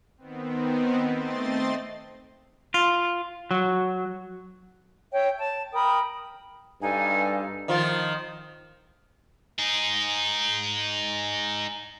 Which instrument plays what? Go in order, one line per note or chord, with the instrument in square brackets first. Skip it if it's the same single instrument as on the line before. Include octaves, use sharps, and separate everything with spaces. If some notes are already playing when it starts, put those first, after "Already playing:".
[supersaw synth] D#3 B3 C4
A3 C4 D#5 C6 A6
[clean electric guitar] F4
F#3
[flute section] C#5 E5 G5
A5
A#4 G5 B5 D#6
[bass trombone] G2 [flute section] D#4 A4 F5 [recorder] G#5
[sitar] D#3 F3 F4
[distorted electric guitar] D#4 G#4